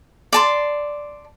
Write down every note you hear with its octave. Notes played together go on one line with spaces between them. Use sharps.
D5 A5 C6